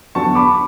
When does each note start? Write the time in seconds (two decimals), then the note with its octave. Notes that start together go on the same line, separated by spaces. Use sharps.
0.15 E2 D3 F#3 B3 A5 C#6
0.35 B5 D6